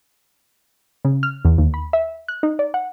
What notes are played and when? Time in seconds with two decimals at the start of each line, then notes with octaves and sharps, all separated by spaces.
1.05 C#3
1.23 F6
1.45 E2
1.58 D#2
1.74 B5
1.93 E5
2.28 F#6
2.43 D#4
2.59 D5
2.74 F#5